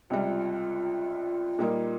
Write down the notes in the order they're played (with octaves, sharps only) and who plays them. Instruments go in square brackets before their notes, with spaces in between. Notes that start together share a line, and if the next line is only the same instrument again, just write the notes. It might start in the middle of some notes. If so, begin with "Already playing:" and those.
[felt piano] C#2 C3 G3 [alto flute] F4
[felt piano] A#2 G3 A#3 D#4